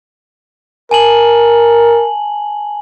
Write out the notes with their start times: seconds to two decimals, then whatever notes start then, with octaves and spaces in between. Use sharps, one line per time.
0.91 A#4 G#5 A5 F#7